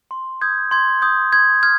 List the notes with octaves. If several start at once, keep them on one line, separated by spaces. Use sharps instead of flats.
C6
D#6 G6 G#6
C6 G#6
D#6 G6
C6 G#6
F6 G#6